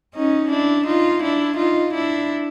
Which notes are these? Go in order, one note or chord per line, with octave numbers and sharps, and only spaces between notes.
C#4 D#4
D4 E4
D#4 F4
D4 E4
D#4 F4
D4 E4